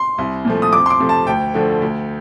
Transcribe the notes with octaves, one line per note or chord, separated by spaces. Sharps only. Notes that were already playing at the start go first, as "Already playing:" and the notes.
Already playing: C6
C2
A#2 F3 A3
D#6
F2 D6
C6
D6
C3 F3 A3
A5
D2 G5
D3 F3 A3
D2